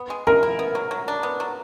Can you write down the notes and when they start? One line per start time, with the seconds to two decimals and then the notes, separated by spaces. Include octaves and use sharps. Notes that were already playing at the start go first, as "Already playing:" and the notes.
Already playing: B3
0.10 G#3
0.27 G#3 A#4
0.43 E4
0.59 B3
0.75 F#3
0.91 F#3
1.08 D4
1.23 B3
1.40 F#3